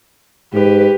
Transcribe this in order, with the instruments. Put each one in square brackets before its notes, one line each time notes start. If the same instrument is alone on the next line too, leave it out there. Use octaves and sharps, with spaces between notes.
[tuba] G#2 [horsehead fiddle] G4 B4